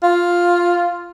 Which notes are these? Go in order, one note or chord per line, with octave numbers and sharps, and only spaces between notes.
F4